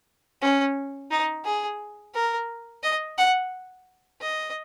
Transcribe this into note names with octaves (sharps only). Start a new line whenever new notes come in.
C#4
D#4
G#4
A#4
D#5
F#5
D#5